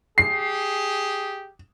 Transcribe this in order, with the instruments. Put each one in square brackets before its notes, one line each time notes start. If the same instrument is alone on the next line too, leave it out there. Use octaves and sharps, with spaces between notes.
[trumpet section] G4 G#4 [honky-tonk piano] C7